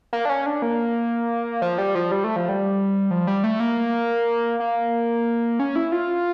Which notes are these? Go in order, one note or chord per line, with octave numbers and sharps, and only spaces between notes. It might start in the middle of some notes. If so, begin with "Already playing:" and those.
A#3
D4
C#4
D4
A#3
F3
G3
F3
G3
A3
F3
G3
F3
G3
A3
A#3
A#3
C#4
E4
F4